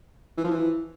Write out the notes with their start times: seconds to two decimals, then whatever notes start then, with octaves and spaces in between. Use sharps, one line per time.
0.37 E3
0.44 F3
0.51 E3